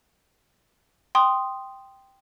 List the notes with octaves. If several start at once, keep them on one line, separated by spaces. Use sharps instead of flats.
G5 C6 D#6